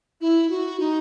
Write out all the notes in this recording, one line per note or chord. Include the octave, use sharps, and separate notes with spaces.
E4
F#4
D#4